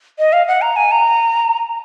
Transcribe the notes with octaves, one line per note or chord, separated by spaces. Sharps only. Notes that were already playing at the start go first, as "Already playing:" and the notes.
D#5
F5
F#5
A#5
G#5
A#5